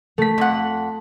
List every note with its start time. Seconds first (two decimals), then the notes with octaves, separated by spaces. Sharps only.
0.18 A3 B6
0.38 F2 F#5